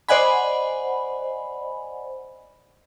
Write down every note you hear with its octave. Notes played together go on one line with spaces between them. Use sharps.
C5 D5 D#5 F#5 G#5 B5